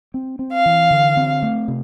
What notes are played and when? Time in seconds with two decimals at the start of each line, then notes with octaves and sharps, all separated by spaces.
0.14 C4
0.39 C4
0.52 F5
0.66 E3
0.91 D3
1.17 C4
1.42 A3
1.68 C3